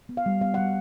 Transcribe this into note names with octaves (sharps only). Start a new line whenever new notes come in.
B3
F5
G3
B3 F5
G3 F#5